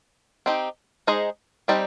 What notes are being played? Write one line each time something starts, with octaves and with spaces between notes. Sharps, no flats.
C4 D#4 G4
G#3 D#4 G#4 C5 D#5
G3 C4 D#4 G4